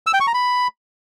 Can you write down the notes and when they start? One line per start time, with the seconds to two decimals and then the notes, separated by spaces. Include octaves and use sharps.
0.07 E6
0.14 G5
0.20 C#6
0.27 A#5
0.34 B5